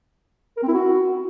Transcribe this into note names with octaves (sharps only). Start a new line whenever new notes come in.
A#4
C4
E4
F#4